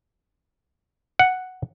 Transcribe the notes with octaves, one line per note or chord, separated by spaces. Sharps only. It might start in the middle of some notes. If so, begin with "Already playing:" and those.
F#5